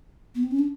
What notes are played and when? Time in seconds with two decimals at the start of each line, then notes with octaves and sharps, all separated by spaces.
0.35 B3
0.43 C4
0.51 C#4
0.59 D4